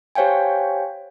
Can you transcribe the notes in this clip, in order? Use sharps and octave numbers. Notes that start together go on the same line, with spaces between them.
G4 C5 C#5 F5 G5 G#5